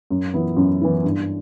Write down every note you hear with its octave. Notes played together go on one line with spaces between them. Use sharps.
F#2
E3 B3 E4
F#2
E3 B3 E4
G2